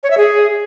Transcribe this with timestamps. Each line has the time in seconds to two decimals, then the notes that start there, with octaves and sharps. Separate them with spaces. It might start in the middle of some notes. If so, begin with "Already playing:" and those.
0.03 C#5
0.10 E5
0.17 G#4